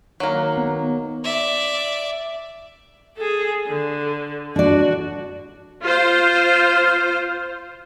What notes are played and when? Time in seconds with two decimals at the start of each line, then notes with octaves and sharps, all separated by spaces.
0.20 D#3 F#3 A#3
0.57 B3
1.24 D5 E5
3.17 G#4 A4
3.67 D3
4.56 D4 F#4 D5
5.83 F4 C5